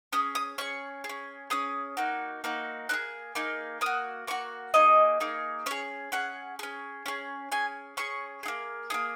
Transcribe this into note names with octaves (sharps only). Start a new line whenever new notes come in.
C#4 G#4 D#6
D#6
C#4 G#4 C#6
G#4
C#4
C#4 G#4 D#6
A#3 D#4 F#4
A#3 D#4 F#4
A#3 D#4 G#4 F#6
A#3 D#4 G#4
A#3 F#4 D#6
A#3 F#4 C#6
A#3 D#4 G#4 D#5
A#3 D#4 G#4
C#4 G#4 C#5
C#4 G#4 F#5
C#4 G#4
C#4 G#4
C#4 G#4 G#5
C#4 G#4 C#6
D#4 G#4
A#3
A#3 D#4 G#4 D#6